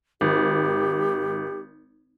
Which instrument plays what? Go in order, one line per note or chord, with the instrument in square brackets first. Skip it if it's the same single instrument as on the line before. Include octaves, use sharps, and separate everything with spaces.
[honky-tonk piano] G#1 [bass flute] G4